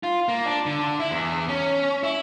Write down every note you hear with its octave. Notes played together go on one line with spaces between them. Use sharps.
F4
A#3
D4
D3
E4
E2
C#4
E4